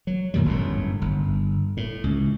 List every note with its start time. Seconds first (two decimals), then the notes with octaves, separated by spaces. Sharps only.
0.07 F#3
0.34 F#2 A#2 D#3 G3
0.45 G1 F#2 A2
1.01 G1
1.77 A2
2.04 C#2